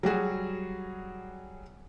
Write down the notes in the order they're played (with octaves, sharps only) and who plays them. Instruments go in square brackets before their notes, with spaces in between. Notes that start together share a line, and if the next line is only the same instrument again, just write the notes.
[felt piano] F#3 G3 F#4 G#4